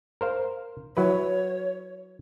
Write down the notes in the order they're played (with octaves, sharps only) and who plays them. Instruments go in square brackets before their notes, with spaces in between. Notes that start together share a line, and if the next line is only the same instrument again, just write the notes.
[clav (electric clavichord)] A#4 C5 F5
[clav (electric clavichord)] F#3 E4 B4 [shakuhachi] C#5